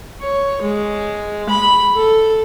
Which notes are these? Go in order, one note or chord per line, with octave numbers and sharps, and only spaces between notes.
C#5
G#3
B5
A4